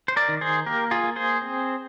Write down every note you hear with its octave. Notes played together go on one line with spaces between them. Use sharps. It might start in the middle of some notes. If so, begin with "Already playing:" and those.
C5
A#4 D5
D#3
G#4 C5
A#3 G4 A#4
F4 G#4
A#3
G#4 C5
C4